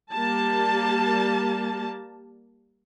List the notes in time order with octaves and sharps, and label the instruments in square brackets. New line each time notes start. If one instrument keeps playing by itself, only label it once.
[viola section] G3 A#3 G4 A5